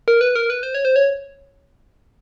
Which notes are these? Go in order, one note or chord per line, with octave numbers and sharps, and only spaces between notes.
A#4
B4
A#4
B4
C5
C#5
C5
C#5